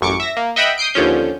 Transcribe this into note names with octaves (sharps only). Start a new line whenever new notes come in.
A1 F#2 C#6 D6 C#7
E5 A#6
A#3
D#5 E5 F#5 G5 B5
D#6 G6 C7 D7
D#2 D3 F3 C#4 G6